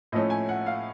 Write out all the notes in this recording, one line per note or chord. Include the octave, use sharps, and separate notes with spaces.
A2 F3 A3 C#4 D#5
G#5
F#5
F5